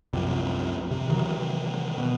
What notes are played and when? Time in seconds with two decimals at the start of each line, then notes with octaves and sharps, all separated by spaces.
0.13 C2 F#2 C3 F3
0.91 C3
1.08 C3 D#3 E3 F#3
1.98 B2